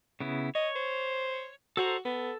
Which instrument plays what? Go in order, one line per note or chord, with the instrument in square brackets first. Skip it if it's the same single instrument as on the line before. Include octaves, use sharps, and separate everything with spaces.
[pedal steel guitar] C#3 B3 E4
[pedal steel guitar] C#5 [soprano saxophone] D#5
[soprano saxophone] C5
[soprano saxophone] F#4 [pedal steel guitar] A4 C5 A#5
[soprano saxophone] B3 [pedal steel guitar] A4